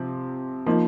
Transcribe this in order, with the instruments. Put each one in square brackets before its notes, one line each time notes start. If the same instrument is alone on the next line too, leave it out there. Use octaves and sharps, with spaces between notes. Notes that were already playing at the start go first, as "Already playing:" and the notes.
Already playing: [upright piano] C3 F3 C4
F3 A#3 D#4